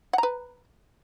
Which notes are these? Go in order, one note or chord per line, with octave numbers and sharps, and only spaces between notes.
B4 F#5 A#5